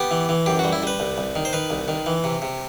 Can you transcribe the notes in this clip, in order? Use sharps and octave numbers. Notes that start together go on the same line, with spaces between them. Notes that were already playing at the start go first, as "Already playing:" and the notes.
Already playing: B3 G4
E3
E3
F#2 G4
F#4
G3
E4
G3 B4
C2
C2
D#3
C5
D#3 B4
C2
D#3
E3
C3
C3